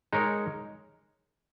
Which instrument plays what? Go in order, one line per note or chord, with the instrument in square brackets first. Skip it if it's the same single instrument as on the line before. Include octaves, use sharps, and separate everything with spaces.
[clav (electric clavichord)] G#3 D#4 A#4 C#5